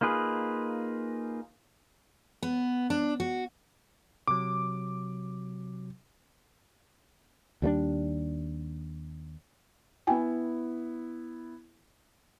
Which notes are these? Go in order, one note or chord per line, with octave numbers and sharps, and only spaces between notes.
A#3 D#4 F4 G#4 B4
B3
D4
F#4
C3 F#3 D6
D#2 G3 A3 D4
B3 E4 G5 G#5